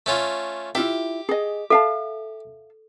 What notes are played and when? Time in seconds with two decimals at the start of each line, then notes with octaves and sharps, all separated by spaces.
0.06 A3 C#4 F4
0.75 E4 F4 G4 E5
1.29 G#4 D#5
1.70 A4 E5 F5 A5